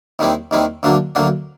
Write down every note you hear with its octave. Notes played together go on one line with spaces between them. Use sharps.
D#2 D#3 G3 C4 E4
D#2 D#3 G3 C4 E4
D2 D3 F#3 A#3 D4
D2 D3 F#3 A#3 D4